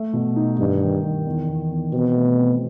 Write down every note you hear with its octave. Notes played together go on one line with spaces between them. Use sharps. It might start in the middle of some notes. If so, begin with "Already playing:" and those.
Already playing: A3
B2
D#4
G2 D#3
D#3
D#3
E2
E2
E2
B2 C4
A3
C4